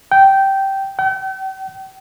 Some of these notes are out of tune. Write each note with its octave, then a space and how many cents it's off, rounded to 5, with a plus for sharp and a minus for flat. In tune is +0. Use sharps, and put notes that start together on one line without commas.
G5 -10
G5 -40